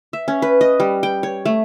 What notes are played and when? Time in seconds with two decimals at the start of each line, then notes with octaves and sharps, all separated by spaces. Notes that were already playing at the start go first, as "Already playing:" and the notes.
0.13 E5
0.28 C#4
0.42 B4
0.61 D#5
0.80 G3
1.03 G5
1.23 C#5
1.46 A3